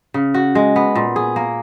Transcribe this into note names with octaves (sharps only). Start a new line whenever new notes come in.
C#3
F#4
G#3
B3
A#2
G#4
A#3